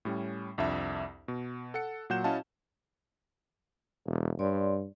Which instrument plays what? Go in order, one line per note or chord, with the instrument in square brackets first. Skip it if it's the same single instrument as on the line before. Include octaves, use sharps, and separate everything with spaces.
[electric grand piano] A2 G3 C#4
C2 F2 D4 E5
B2
A4 F#5 C#7
A#2 F#3 F#5 G6 E7
C#4 E4 F#4 D#5 F5 A5
[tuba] E1
[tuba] G2 [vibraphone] C#5 D5 C6